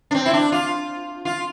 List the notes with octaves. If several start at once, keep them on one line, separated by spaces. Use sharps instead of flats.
D4
C4
E4
D4
F4
F4